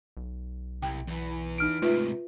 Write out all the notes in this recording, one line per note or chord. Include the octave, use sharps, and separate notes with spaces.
B1
C2 G5
E2 E3
D#4 F6 D7
G#2 C3 A3 F4 B4 E5